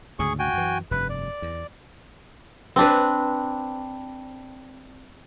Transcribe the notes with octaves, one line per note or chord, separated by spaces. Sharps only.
D2 G#2 C#3 G#4 C#6
F#4 G5 G#5
F#2 E3
F1 G2 B4
D5
E2
C4 D4 B4